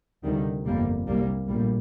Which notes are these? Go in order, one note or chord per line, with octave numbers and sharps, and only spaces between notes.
D2 C3 D#3 G3
G1 F2 C3 G3 A#3
C2 C3 G3 A#3
A#1 A2 G3 A#3